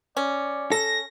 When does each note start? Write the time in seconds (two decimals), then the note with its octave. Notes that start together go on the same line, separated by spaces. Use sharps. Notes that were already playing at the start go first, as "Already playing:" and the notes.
0.17 C#4 D5
0.72 A4 A#6